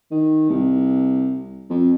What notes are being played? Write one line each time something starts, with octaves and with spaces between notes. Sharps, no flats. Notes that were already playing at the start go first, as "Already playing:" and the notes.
D#3
C2
F2